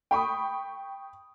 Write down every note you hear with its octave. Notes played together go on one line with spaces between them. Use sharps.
G5 B5 C#6 D#6